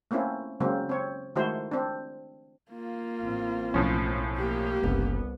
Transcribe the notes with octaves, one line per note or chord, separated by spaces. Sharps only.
A3 A#3 C4 C#4 E4
C#3 F#3 G#3 A#3 C4
C4 C#5
D#3 G#3 A3 E4 F#4 C5
C4 D4
A#3 F4
A1 C4
B1 A2 F3 C#4
A#3 G4
F#1 C2 B3